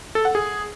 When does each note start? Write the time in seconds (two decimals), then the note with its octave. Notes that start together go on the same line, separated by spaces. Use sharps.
0.15 A4
0.25 F#5
0.35 G#4